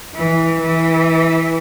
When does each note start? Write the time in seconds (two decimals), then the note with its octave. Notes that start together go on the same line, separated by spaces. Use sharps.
0.15 E3
0.61 E3